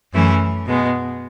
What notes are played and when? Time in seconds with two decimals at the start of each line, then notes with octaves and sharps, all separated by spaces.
0.13 F#2 E3 A3 C#4 E4
0.67 B2 G#3 B3